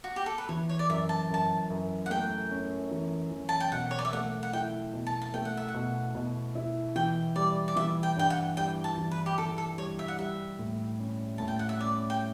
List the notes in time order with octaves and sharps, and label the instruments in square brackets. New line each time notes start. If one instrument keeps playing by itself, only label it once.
[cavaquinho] F#4
G4
A4
B4
[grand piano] E3 [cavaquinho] C#5
[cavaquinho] C#5
D5
[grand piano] F#2 [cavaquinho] E5
[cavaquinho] A5
[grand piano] F#2 [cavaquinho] A5
[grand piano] F#2
[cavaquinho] F#5
[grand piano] A3 [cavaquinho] G5
[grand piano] C#4
E3
E3
[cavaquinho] A5
G5
[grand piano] B2 [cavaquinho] F#5
[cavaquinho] C#5
D5
E5
[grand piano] A3 [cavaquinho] F#5
[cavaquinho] F#5
[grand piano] E4 [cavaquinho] G5
[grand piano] B2
[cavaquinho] A5
A5
[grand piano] A3 [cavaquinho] G5
[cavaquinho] F#5
E5
F#5
[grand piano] B2
B2
E4
[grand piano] E3 [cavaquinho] G5
[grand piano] G3 [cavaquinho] D5
[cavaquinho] D5
[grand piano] E3 [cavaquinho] E5
[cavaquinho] G5
[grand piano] G2 [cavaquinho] G5
[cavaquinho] F#5
[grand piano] G3 [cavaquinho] G5
[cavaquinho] A5
[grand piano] E3
[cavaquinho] B4
G4
[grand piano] E3 [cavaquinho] A4
[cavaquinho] A4
[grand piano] G3 [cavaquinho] C#5
[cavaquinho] E5
F#5
[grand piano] G3 [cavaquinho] E5
[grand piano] A2
C#4
[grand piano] A2 [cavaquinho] A5
[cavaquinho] G5
F#5
E5
[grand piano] C#4 [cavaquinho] D5
[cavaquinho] G5